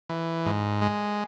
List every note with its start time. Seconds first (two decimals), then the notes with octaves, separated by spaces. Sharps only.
0.09 E3
0.46 G#2
0.82 G#3